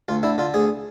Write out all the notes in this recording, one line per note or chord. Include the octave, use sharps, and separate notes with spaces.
D2 F4
D3 E4
D3 F4
D2 G#4